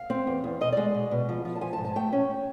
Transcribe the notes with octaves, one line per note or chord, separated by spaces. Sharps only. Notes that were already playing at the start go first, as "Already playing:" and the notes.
Already playing: F5
C4
E2
E2
B2 D#5
G#3 D5
B2
B2
F3
F3
A5
F3 G#5
A5
G#2
A5
A3 G5
C#4